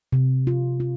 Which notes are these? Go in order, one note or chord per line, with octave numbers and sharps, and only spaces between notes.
C3
F4
F4